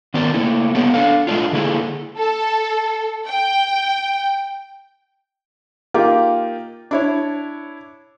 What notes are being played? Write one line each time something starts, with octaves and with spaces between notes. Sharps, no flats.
D#3 B3 C4 G4 A#4 D5
A3 A#3 E4
B3 G4 A4 C#5
D4 A4 F5
G#3 A3 D4 F4
D3 F#3 A#3 E4 G#4 A4
A4
G5
A#3 D#4 F4 G4 G5
D4 E4 C#5